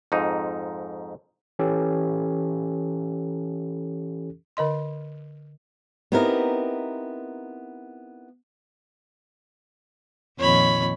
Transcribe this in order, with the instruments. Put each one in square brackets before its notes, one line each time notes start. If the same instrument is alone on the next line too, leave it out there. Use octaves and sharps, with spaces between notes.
[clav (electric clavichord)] F2 G#2 D#4
[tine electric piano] E3 C#4 G4 A4
[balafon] D3 A#4 D#5 C6
[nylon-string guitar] B3 C4 D#4 E4 G4 A#4
[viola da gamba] F2 A#2 D#3 [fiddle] C#5 B5